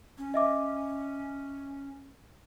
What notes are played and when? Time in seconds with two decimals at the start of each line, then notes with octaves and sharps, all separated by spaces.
0.18 C#4
0.34 D#5 E5 D6